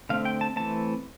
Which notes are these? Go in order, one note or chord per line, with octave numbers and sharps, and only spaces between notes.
D3 A3 C4 F5
G5
A5
E3 A3 C4 A5